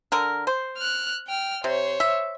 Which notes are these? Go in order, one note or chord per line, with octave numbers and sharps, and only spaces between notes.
D3 A#4
C5
F6 F#6
G5 F6
C3 C5 C#5
E5